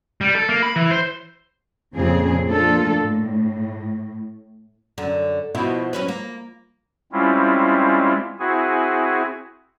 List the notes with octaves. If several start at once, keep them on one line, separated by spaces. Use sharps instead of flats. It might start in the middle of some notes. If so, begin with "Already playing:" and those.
G3
A4
A#3
B5
E3
C5
F2 A#2 C#3 F3 C4 G#4
F3 A3 A#3 D4 F4 A4
A2
F#2 D3
B2 F3 E4
F#3 C#4 B4
A#3
G3 G#3 C4 C#4 E4 F4
C4 E4 F#4 G#4 G#5